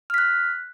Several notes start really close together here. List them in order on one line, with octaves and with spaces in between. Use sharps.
F6 B6 F#6